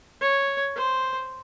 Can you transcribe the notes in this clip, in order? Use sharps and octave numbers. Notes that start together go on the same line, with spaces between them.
C#5
C5